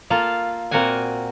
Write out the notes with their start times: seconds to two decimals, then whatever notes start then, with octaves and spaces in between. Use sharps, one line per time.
0.10 A#3 F4 A4 F5
0.71 A#2 A#3 C4 F#4 F#5 G#5